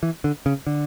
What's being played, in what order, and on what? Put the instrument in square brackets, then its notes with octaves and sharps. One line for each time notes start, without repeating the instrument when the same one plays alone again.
[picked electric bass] E3
D3
C#3
D3